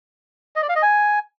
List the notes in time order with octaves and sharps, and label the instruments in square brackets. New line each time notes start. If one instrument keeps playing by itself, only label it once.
[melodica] D#5
D5
F5
D#5
G#5